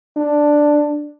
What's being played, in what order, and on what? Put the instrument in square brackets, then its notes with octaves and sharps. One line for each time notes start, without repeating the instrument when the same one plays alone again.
[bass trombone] D4